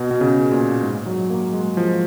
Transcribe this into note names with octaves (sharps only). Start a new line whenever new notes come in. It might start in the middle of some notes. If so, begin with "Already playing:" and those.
Already playing: B2
B2
C#3
A#2
G#2
F#3
A#3
G#3
F3